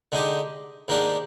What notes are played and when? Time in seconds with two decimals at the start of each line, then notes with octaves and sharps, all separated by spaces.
0.12 D3 G#3 D#4 G4
0.88 G#2 D#3 A#3 D4 G4